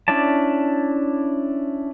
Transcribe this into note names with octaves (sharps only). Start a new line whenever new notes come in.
C#4 D4 E4 D5 A5